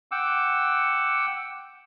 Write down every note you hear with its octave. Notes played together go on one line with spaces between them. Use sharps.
F#5 G5 D6 E6